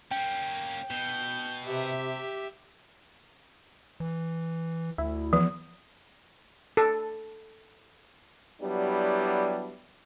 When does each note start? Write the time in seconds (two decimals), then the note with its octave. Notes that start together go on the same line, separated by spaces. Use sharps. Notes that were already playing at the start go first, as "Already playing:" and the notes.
0.11 A#3 C#4 G5
0.91 B2 G6
1.65 C3 G4 E5
4.00 E3
4.98 D2 E4
5.33 E3 F3 B3
6.77 A4
8.62 F#3 G3 B3 D4 E4 G4